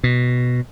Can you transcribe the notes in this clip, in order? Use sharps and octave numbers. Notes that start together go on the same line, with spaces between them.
B2